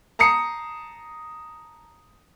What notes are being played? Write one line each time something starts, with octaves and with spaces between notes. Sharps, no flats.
A5 A#5 D#6 C7 C#7